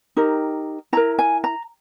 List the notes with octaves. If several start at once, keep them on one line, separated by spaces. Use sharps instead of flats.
D#4 G4 A#4
E4 A#4 A#5
G#5
A#5